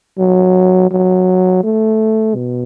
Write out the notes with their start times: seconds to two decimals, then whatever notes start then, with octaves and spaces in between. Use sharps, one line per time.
0.18 F#3
0.91 F#3
1.64 A3
2.35 B2